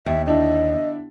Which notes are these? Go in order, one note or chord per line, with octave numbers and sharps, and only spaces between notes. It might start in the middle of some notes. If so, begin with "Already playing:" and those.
D#2 E5
D3 D4 E4 D#5